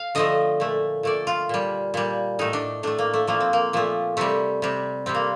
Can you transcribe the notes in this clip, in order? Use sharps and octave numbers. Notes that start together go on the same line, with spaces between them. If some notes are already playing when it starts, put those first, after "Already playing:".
Already playing: F5
D3 F3 A3 D#5
A#2 A3
A#2 A3 D5
F4
A#2 G3
A#2 G3
A2 A3 D#4
D4
A2 A3 D4
A#3
A3
A#2 F3 A3 A#3
C4
A#3
A#2 F3 A3
C3 G3 A3
C3 G3
C3 G3 C4
A#3